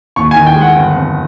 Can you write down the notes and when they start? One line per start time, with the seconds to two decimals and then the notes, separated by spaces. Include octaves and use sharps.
0.16 D#2 C#6
0.31 G#5
0.36 D#3
0.46 G5
0.56 G#3
0.61 F#5
0.76 G1
0.96 F2